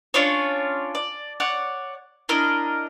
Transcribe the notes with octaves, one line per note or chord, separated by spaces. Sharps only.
C#4 D4 F4 C#5
D5
C#5 D5 F#5
D4 E4 A#4 D#5